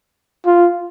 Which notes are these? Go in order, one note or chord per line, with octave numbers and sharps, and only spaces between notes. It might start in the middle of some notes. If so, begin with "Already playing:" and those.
F4